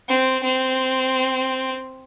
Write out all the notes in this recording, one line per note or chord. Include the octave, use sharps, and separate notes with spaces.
C4
C4